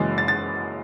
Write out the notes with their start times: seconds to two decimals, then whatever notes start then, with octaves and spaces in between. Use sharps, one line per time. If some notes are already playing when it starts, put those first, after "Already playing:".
Already playing: F#1 F#2 E3 G#3 A6
0.18 A6
0.28 A6